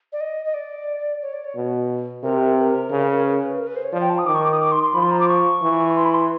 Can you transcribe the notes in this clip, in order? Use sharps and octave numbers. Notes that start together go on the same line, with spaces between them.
D5
D#5
D#5
D5
C#5
D5
C#5
B2
C3 A#4
B4
A#4
C#3
A#4
B4
A#4
B4
C5
C#5
F3 D5
G5
A5
D#6
D#3 D6
C#6
D6
D#6
D6
C6
C6
F3 B5
C6
A#5
D6
C#6
E3
C6
B5
C6